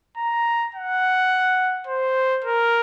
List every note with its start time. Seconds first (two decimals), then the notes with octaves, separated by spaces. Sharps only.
0.17 A#5
0.75 F#5
1.87 C5
2.44 A#4